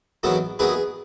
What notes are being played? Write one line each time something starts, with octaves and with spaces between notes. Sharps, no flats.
E2 D#3 F#3 B3 F#4 A4
E2 D#3 F#3 B3 G#4 B4